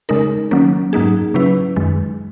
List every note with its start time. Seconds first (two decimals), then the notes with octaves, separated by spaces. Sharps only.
0.09 C#3 G#3 D#4 A#4
0.51 D#3 F#3 A#3 C#4
0.93 G#2 F#3 A#3 D#4 G#4
1.34 C#3 F#3 C#4 E4 B4
1.76 F#2 D#3 G#3